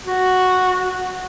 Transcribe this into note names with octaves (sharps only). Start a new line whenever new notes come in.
F#4